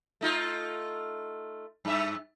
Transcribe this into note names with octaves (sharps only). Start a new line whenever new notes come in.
A3 D#4 F4
G2 E5